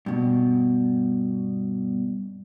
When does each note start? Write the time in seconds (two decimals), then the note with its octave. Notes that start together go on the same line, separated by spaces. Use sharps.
0.06 G2 B2